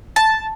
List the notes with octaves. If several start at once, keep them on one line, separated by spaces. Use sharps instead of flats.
A5